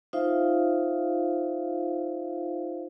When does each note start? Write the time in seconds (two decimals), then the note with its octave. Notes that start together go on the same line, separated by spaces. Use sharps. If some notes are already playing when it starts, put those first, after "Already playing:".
0.13 D#4 F4 C5 E5 F5